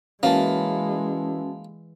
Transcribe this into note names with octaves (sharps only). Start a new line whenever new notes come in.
E3 G#3 A#3 C#4 F#4 A5